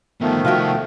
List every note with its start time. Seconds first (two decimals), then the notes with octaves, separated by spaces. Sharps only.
0.21 D3 D#3 F3 A3 B3
0.45 C2 F4 F#4 E5 G5